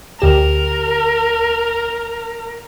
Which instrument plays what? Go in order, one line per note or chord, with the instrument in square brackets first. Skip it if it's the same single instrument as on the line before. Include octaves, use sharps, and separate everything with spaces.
[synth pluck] D2 G4 E7 [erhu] A#4